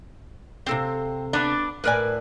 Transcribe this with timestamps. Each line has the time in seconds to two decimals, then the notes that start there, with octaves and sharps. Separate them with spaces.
0.66 C3 C4 A4 F5
1.33 B3 D4 D5
1.84 A2 A#4 B4 D5 G#5